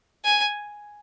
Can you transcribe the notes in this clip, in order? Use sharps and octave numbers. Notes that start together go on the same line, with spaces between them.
G#5